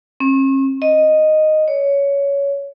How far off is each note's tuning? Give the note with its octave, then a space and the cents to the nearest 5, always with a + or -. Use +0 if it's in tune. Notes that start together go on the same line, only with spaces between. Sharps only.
C#4 -45
D#5 -5
C#5 +15